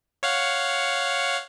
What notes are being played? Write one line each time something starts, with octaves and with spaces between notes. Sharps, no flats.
C#5 F5 F#5